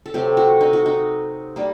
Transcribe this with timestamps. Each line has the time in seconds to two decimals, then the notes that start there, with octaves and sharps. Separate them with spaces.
0.06 A4
0.14 C3 F#3 A3 G4
0.37 F#4
0.61 D#4
0.73 F#4
0.86 D#4
1.56 G3 A#3